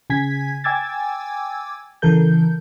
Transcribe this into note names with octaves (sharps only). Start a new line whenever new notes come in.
C#3 G#5 G#6 B6
G5 G#5 D6 E6 G#6 A6
C#3 E3 A4 A#4 G6